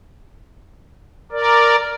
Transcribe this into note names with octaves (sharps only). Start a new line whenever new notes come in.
A#4 D5